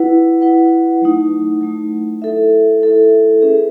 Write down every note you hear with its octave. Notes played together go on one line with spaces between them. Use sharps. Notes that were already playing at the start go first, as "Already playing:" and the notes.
Already playing: E4 B4 F#5
E4 B4 F#5
F#3 A3 D#4
F#3 A3 D#4
E4 A4 E5
E4 A4 E5
C#4 G#4 B4